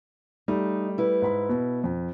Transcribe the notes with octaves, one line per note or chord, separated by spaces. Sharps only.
G3 A3 D#4
E4 B4
G#2 B5
B2
F2